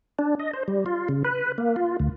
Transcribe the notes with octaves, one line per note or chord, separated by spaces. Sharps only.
D4
D#5
C5
G3
F4
C#3
B4
A#3
F4
D2